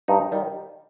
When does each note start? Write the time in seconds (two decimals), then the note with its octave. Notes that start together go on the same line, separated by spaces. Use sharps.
0.08 G2 D#4
0.32 D#3 G3